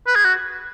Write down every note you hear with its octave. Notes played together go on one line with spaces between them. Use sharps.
B4
G#4
F#4